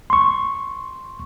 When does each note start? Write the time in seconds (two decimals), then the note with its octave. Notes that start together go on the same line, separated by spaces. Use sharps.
0.10 C6 C#6